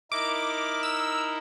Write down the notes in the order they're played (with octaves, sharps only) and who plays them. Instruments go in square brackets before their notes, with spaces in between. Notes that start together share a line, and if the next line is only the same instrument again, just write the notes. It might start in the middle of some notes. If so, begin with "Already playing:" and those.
[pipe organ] D#4 E4 A#4 [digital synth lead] D6
[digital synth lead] E6